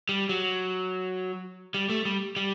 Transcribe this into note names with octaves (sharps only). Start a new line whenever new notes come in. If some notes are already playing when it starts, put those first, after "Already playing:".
G3
F#3
G3
A3
G3
G3